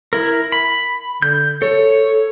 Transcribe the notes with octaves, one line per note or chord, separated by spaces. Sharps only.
E4 A#4
B5
D3 G6
A4 C#5